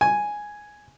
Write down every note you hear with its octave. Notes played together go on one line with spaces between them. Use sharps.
G#5